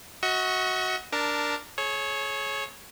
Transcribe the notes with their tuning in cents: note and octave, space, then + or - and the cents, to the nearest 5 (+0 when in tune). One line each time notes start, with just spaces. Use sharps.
F#4 +0 D#5 +45 C#6 +0
D4 +0 A#4 +0 A5 +15
G#4 +40 C#5 -10